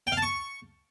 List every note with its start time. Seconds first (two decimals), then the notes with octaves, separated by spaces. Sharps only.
0.07 G5
0.12 F5
0.17 A5
0.22 C#6